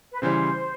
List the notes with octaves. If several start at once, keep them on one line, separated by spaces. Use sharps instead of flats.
B4
C#3 E3 G3 C5